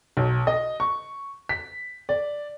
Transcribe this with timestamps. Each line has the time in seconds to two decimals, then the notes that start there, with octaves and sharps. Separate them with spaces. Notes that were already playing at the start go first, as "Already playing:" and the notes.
0.17 B1
0.47 D#5
0.80 C#6
1.49 B6
2.09 D5